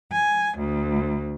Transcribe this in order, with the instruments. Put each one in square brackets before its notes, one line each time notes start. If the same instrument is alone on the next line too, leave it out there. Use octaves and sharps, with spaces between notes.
[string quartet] G#5
D2